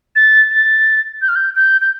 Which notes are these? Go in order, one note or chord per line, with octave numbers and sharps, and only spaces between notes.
A6
A6
G6
F6
G6
G6
G6